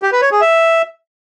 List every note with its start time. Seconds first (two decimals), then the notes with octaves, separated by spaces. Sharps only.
0.03 G4
0.12 B4
0.22 C#5
0.31 G#4
0.41 E5